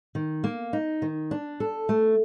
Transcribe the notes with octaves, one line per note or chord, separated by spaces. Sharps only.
D#3
A#3
D#4
D#3
D4
A4
A3